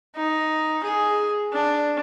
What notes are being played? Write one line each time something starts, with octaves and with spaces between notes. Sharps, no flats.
D#4
G#4
D4